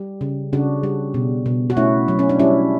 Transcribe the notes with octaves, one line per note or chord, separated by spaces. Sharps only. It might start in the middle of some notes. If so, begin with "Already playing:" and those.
Already playing: G3
C#3
C#3 D4 F#4
G3
B2
B2
F#4
A3 C#4 E4
F#3
C#4
D4
G3 C#4 E4